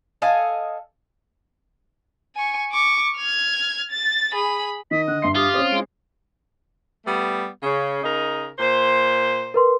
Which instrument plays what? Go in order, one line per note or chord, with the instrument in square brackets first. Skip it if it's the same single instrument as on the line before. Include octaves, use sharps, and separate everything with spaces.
[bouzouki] A4 D#5 F5 G#5
[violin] G#5 C#6
C#6 D6
F6 G#6
A6
G#4 B5
[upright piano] D#3 [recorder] D#5 [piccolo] B6
[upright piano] D3 [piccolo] F#6
[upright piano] G2 E5 C7 [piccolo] C6
[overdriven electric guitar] F4 [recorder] G4 [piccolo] D#6
[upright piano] C4 C#4 [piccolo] D#6
[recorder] G#3 [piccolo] D7
[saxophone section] G3 A3 B3
C#3
C#3 D#4 A#4
A#2 C5
[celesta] A#4 B4 C6